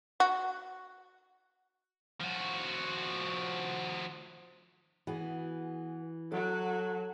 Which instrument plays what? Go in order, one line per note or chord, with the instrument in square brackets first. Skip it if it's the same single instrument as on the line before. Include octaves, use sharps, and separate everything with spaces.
[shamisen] F#4
[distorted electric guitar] F3 F#4
[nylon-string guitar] E3 [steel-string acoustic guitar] B3 F#4 G#4
[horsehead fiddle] F#3 F#4 [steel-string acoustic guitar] A4